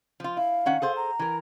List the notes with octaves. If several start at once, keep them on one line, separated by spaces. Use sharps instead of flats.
F3 F4
E4 F5
D#3 C#4 F#5
G#4 A4 C5
A#5
E3 A#4